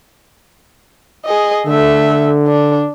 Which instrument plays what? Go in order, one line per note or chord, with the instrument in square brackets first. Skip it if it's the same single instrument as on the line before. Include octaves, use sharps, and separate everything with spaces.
[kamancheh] G#4 D#5
[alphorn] D3 [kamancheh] A3 E5
[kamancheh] D4